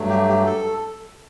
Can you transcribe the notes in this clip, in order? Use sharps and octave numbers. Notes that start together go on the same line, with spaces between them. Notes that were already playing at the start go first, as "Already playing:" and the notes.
Already playing: G2 F#3 A3
G4
G4
A4